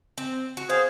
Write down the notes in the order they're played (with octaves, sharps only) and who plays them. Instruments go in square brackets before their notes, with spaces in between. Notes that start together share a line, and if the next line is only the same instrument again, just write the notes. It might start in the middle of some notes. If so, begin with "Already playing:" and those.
[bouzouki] C4
F#4
[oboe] G#4 [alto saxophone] C5 [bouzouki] F5